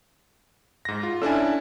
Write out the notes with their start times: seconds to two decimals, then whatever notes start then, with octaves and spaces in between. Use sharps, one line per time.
0.85 G#2 A#6
1.03 F4
1.22 C#4 D4 E4 A4 G#5